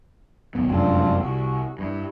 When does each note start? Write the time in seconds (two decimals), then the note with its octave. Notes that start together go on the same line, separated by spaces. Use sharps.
0.55 D#1 B1 B3
0.69 F1 F#2 G#3 C4 D4 F4
1.20 C2 F#4
1.79 G2 E4